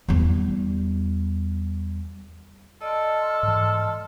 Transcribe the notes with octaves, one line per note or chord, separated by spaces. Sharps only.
E2 G3
A4 D5 D#5 A5 C6 F6
G#2 E3